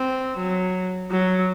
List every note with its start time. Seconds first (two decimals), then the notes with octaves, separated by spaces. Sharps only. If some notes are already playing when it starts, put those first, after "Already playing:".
Already playing: C4
0.38 F#3
1.11 F#3